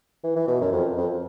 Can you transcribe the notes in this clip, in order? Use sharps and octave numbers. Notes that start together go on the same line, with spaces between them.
E3
E3
B2
F#2
F2
F2